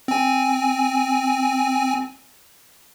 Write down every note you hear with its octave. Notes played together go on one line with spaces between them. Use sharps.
C4 G#5